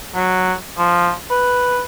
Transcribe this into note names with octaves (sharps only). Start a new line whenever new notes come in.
F#3
F3
B4